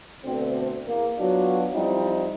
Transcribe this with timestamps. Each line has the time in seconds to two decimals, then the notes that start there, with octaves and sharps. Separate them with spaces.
0.25 D2 B2 D3 C4
0.87 E2 A#3
1.19 F#3 B3 D4 F4 F#4
1.73 F3 G3 C4 D#4 E4